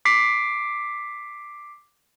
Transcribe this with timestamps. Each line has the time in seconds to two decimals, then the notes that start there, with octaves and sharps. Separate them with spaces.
0.05 D6 B6 C7 D7